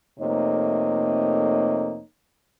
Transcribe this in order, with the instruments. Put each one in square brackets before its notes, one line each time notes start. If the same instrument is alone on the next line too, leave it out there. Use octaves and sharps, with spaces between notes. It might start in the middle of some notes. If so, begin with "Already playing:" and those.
[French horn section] F2 C3 A3 A#3 D#4 C#5